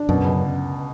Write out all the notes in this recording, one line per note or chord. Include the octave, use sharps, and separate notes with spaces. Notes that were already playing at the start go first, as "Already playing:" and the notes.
Already playing: D4
F#2 B2
C#2